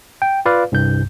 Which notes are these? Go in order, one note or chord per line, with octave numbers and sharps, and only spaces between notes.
G5
F4 B4 D5 F5
C2 G2 G6